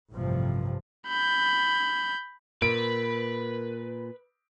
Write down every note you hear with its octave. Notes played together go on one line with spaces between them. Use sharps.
A1 G2 C3 F3
B5 G6
A#2 A#4 B4 D7